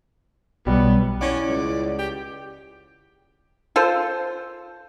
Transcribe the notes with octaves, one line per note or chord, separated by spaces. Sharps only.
B1 G3 B3
C#4 E4 D5 F#5
C#2
G4
F4 A4 C5